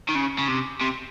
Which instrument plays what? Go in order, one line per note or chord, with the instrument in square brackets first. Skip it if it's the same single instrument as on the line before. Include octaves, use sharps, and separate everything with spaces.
[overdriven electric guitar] D#3
C#3
C#3
C3
C3